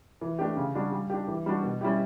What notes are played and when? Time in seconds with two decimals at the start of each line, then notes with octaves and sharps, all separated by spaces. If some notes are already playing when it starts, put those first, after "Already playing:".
0.21 E3
0.39 A3 D4 G4
0.57 C#3
0.75 G3 D4 F#4
0.92 G3
1.10 D4 G4
1.28 E3
1.46 G3 D4 F#4
1.64 B2
1.81 G3 C#4 E4 G4